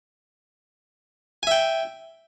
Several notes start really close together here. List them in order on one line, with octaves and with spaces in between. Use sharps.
G#5 E5 G5